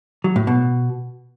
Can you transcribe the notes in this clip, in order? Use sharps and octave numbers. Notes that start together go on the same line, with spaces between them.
F#3
A2
B2